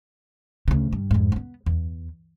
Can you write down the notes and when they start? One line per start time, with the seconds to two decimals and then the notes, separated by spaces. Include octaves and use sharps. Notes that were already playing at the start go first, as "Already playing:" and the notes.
0.68 D2 C#3
0.93 G2
1.11 F2 G#2
1.32 B3 C4
1.66 E2